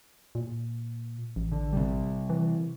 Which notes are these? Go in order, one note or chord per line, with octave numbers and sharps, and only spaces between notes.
A#2
A1
D3
C3 G3
E3